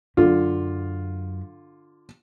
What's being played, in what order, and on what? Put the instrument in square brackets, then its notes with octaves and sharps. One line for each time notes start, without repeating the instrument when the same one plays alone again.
[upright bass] F#2 [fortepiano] D3 F4